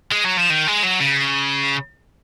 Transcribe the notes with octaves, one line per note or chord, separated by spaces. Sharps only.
G#3
F#3
F3
D#3
G#3
F#3
C#3